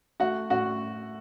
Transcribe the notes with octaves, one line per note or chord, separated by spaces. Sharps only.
A3 F#4 F#5
A2 F#4 F#5